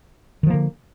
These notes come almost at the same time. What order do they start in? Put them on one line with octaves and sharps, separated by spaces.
D#3 F3 A#3 D3